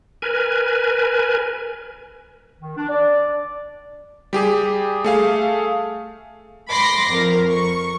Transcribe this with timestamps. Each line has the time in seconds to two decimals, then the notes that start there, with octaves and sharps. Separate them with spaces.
0.22 A#4 B4 G#5
2.61 D#3
2.77 D4
2.89 D5
4.33 G3 G4 G#4
5.04 A3 G#4 F5
6.70 B5 C6 D6 A#6 C7
7.12 F2 A#4
7.51 C#6